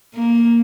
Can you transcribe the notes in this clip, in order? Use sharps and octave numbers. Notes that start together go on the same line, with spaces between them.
A#3